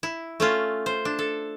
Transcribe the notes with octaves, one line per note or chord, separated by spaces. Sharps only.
E4
A3 C#4 F4
C5
D4
A4